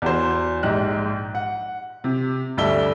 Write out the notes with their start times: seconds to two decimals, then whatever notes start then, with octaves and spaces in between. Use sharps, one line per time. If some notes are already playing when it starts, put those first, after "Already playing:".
0.02 E2 F#4 C5
0.63 A#1 G#2 D#4 G4 F#6
1.35 F#5
2.04 C3
2.57 D2 G2 D5 E5 A5 G7